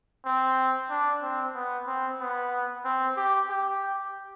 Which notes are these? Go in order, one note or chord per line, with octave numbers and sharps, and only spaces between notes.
C4
D4
C4
B3
C4
B3
C4
G4
G4